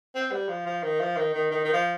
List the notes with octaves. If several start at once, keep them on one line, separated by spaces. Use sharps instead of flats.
C4
G3
F3
F3
D#3
F3
D#3
D#3
D#3
D#3
F3